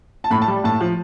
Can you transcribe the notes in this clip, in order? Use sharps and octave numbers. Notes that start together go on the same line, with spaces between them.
A5
A2 B5
A5
G3
A2 A5
F3